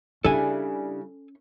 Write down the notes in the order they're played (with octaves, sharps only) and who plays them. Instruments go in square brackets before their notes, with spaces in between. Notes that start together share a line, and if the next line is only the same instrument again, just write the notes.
[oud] C#3 E4 [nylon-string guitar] G3 D4 [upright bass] C#4 [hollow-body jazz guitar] A4 G#5